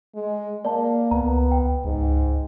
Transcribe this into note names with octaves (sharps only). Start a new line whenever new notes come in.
G#3
A#3 D5 A5
C#2 B3 A#5
G5
C#2 G#2